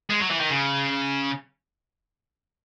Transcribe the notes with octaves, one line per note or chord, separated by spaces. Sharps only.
G#3
F#3
E3
D#3
C#3